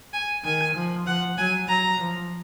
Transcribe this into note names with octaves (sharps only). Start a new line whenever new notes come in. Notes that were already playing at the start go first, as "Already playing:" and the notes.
G#5
D#3 G#5
F3
F3 F#5
F#3 G#5
F#3 A#5
F3